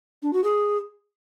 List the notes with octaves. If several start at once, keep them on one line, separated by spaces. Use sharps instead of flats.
D4
F#4
G#4